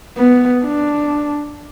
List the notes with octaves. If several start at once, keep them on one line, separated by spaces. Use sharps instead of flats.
B3
D4